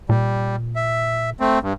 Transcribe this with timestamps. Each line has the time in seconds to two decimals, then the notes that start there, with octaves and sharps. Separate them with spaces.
0.09 A#2 G3
0.76 E5
1.40 A3 C4
1.62 G2